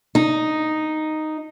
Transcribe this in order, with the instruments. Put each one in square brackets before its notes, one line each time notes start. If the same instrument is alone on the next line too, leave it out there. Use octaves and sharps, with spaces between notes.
[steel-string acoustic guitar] D#4